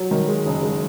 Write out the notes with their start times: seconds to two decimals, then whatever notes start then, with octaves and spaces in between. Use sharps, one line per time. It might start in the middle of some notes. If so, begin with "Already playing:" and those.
Already playing: F#3
0.11 D#3
0.28 G#3
0.46 F#1
0.63 G#3